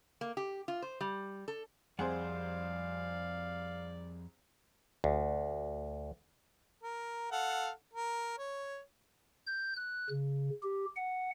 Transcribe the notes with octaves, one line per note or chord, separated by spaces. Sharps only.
A#3
G4
F4
C5
G3
A4
C2 F2 G#4 C5 D5 F5 F#5
D2
A#4
A4 F5 F#5
A#4
C#5
G6
F#6
C#3
G4
F#5